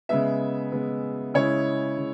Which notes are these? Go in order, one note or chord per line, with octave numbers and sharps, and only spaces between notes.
C#3 G#3 B3 E5
C#3 G#3 B3
C#3 G#3 E4 C#5
C#3